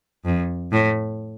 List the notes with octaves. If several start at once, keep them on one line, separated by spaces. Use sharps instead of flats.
F2
A2